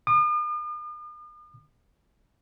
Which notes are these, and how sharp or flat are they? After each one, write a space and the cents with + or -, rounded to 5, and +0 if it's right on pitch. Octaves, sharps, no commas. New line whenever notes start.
D#6 -45